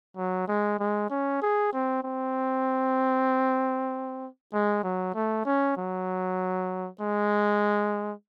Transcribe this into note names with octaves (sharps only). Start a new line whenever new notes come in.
F#3
G#3
G#3
C#4
G#4
C4
C4
G#3
F#3
A3
C#4
F#3
G#3